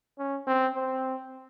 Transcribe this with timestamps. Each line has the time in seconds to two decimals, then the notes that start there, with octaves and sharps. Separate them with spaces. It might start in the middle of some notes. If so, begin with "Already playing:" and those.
0.19 C#4
0.47 C4
0.75 C4